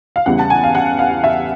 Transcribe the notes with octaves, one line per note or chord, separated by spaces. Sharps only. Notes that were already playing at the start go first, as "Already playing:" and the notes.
F5
E2 C#3 E3 G3 B3 F#5
A5
G#5
F5
F#5
F5
E5